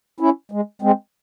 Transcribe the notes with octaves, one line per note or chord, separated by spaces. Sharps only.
C#4 E4
G#3
G#3 C4